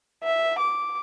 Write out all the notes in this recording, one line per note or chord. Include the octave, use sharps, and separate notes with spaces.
E5
D6